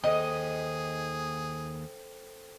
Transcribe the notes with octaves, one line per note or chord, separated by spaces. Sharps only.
D#2 G#4 A4 C5 D#5 G5